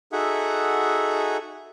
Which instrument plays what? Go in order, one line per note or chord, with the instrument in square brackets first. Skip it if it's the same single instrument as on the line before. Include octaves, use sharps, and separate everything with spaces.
[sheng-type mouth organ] D#4 F#4 G#4 A4 E5 F#5